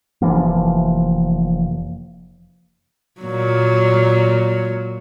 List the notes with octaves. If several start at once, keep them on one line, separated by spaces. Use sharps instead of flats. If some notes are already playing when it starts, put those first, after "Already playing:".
F1 E3 F3 A#3
A#2 F#3